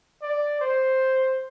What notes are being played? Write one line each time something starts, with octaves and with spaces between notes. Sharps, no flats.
D5
C5